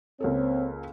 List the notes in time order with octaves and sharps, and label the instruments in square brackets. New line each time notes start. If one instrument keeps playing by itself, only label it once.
[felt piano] C#2 A#3 A4 [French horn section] C4 C#5